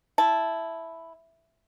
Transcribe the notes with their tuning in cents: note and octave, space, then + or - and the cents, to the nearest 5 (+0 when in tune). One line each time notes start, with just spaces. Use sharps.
E4 +0 A5 -10